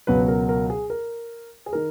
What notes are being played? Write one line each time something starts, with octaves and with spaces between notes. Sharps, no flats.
C#2 B2 F#3 B4
A#4
A#4
G#4
A#4
G#4
D#3 A#4